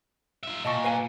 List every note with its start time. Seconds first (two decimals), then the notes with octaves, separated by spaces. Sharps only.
0.43 F4 E5
0.65 A#2 D#5 A5 C#6
0.84 B4 F5 G#5